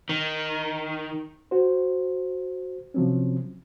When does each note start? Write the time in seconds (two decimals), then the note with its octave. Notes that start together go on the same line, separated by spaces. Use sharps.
0.09 D#3
1.51 F#4 C5
2.94 C3 F3 F#3 C4 C#4